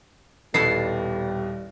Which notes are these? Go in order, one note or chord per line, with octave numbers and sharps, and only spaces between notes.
D#1 B2 G3 B3 E4 A4 C7